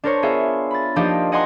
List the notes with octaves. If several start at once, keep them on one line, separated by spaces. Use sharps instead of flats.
D4 A#4 C5 C#5
B3 F4 G#4 E5
B5 A6
F3 A#3 D4 D#4 G4 D#5
D#5 F#5 G#5 A#5 C6 D#6